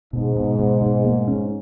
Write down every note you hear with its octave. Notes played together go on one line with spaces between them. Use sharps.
G#2 B2
B2
B2
B2
A#3
C#4